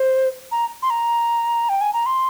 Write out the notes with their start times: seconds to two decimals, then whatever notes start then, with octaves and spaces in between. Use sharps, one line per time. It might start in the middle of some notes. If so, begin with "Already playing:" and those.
Already playing: C5
0.52 A#5
0.82 C6
0.90 A#5
1.69 G5
1.81 G#5
1.93 A#5
2.06 C6